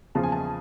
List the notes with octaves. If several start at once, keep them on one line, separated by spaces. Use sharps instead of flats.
E2 C#3 F3 A5
G#5
A5